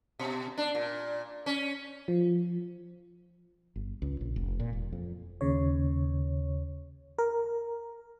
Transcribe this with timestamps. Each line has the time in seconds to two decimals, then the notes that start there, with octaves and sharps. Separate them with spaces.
0.19 B2
0.58 D4
0.75 A#2
1.46 C#4
2.08 F3
3.76 G1
4.02 C#2
4.21 A#1
4.36 F1
4.60 A#2
4.73 E1
4.93 F2
5.41 D#2 C#3 C#5
7.18 A#4